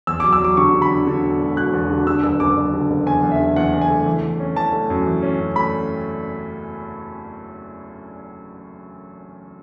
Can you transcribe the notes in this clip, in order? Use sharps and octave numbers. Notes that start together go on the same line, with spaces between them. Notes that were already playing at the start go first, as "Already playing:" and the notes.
E2 E6
D6
F#3
E6
F#3 D6
D3 C#6
D3
B5
D3
D3
E1
E1
E1 F#6
E2
D3
D3 E6
F#1 E6
F#1 D6
F#1
D3
F#1
E2 G#5
E2
E5
D3
E2 F#5
E2
G#5
A3
E3
E3
C#4
E3 A5
A3
F#2
E3
C#4
F#2
A3 B5